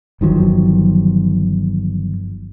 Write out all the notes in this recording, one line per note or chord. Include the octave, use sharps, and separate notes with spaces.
G1 D#3 F3 F#3